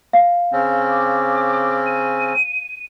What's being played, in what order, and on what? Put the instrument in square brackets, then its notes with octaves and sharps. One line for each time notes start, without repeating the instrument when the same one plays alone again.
[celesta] F5
[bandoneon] C#3 C4 C#4
[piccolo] D6
D#7